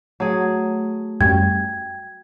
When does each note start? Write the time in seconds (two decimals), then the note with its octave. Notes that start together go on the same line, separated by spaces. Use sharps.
0.20 F#3 A3 G#4
1.21 F#2 G3 C#4 G5 G#6